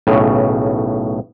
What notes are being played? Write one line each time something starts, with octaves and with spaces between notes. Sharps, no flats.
B1 A2 C#3